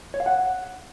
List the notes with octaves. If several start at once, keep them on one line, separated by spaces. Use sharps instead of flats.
C#5
F5
F#5